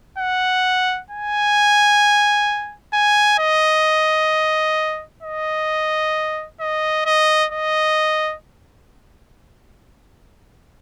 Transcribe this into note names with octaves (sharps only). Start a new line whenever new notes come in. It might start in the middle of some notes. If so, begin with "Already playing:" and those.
F#5
G#5
G#5
D#5
D#5
D#5
D#5
D#5